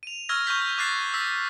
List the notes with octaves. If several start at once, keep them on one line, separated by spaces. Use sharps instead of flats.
D#7 F7
C#6 E6 F6 G#6 A#6
C#6 F6 G6 B6 F#7
G6
D6 F6 F#6 A6 A#6 C7
E6 A#6 B6